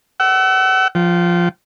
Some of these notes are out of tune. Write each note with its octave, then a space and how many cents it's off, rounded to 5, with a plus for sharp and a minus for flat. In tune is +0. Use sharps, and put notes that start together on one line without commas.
F#5 +35 E6 +0
F3 +0 G5 -35